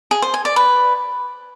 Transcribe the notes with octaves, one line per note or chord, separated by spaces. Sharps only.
G#4
C5
G#5
D5
B4